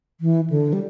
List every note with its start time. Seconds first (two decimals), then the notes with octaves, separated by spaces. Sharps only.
0.21 E3
0.50 D3
0.73 G3